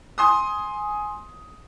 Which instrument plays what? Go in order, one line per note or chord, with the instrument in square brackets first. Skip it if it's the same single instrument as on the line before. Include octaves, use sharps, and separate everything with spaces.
[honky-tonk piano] G#5 C6 D#6